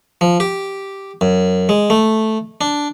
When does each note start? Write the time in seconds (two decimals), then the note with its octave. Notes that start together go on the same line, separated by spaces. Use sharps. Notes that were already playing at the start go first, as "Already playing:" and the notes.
0.21 F3
0.40 G4
1.21 F#2
1.69 G#3
1.90 A3
2.61 D4